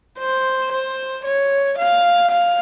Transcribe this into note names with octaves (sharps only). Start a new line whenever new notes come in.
C5
C5
C#5
F5
F5